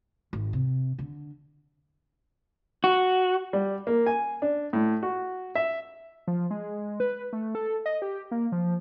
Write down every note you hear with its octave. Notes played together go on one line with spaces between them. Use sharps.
G#1
C3
D3
F#4
G3
A#3
G#5
D4
A2
F#4
E5
F3
G#3
B4
A3
A4
D#5
G4
A#3
F3